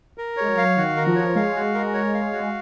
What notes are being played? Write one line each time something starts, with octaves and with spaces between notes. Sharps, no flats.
A#4
G#3 C#5
F#3
F5
D#3 F#4
A#4
F3
C#5
G#3 F5
F#4
A#4
C#5
F5
F#4